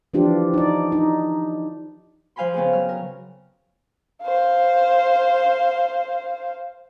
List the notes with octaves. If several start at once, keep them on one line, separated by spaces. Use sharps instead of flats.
E3 F3 D4 F4 G4
D#4 D5
D#4
F3 C5 F5 G#5 B5 C6
C#3 B3 C4 G#4
F#3 F6
A#4
C5 F5